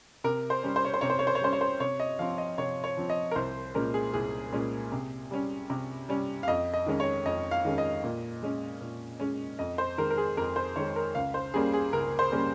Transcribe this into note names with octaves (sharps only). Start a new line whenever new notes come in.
C3 A#4
C5
G3 C#4
C5
C#5
C5
C3 C#5
C5
C#5
C5
C#5
G3 C#4 C5
C#5
C5
C3 C#5
D#5
F3 C4 F5
D#5
C3 C#5
C#5
F3 C4
D#5
A#4
C2 C5
A#2 G#3 C#4 A#4
G#4
C2 G#4
A#2 G#3 C#4
C3
G3 C#4
C3
G3 C#4
F5
F2 D#5
D#5
D#3 G#3 C#4
C#5
F2 D#5
F5
D#3 G#3 C#4
D#5
A#2
G#3 C#4
A#2
G#3 C#4
F2 D#5
C5
D#3 G#3 A#4
A#4
G#4
F2 A#4
C5
D#3 G#3 C#5
A#4
C#2 F5
C5
C#3 G3 A#3 C#4 G#4
G#4
C#2 A#4
C5
C#3 G3 A#3 C#4